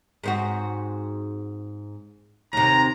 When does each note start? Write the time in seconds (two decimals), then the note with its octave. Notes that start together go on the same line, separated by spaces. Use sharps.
0.23 G#2 C4 F#4
2.53 D#2 C3 A#5